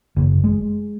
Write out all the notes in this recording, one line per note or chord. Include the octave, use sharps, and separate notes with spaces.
F#1
G#3